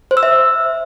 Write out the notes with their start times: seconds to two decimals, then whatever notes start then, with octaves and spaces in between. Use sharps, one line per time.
0.11 C5
0.17 E6
0.23 E5